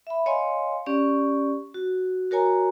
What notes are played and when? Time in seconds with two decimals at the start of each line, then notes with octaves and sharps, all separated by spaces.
0.07 E5 B5
0.26 C#5 D#5 F5 G#5 C6
0.86 C#4 G4 D5 C#6
1.74 F#4
2.31 F#4 A#4 C#5 G#5 A#5